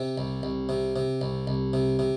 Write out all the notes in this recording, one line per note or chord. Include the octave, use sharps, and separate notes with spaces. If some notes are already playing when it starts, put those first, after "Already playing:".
Already playing: C3 C4
C2
C2
C3
C3
C2
C2
C3
C3